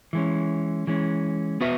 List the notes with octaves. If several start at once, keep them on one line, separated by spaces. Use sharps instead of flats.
E3 G#3 C#4
E3 G#3 C#4
B3 F#4 B4 E5